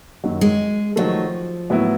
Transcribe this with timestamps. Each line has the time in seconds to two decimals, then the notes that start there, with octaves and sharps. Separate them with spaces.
0.24 F#2 D#3 F#3
0.41 G#3
0.96 D#3 F3 F#3 A3
1.70 A2 F#3 B3 E4